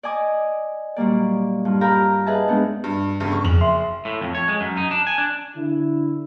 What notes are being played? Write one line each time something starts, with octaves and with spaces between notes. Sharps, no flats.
D5 D#5 G#5 D6
A#2 F#3 G3 A#3 D5
G2 F4
G4 A#4 F5 A#5 B5
G#4 B4 D#5 E5 A5
G#2 B3 D4 D#4
G2
G1 G2 C#3
C#6
F#1 F2 F7 F#7
E5 C6
A2
F2
C#5
G#3
F#2
D#4
D4
G#5
D4
D3 E4